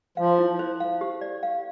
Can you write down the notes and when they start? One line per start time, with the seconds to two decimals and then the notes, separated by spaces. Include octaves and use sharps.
0.17 F3 F5
0.39 E4
0.59 C5
0.80 F5
1.01 G4
1.21 D5
1.43 F5